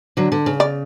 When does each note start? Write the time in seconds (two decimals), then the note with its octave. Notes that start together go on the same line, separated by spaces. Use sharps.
0.17 D3 F#3
0.32 D3
0.46 C#3
0.60 D5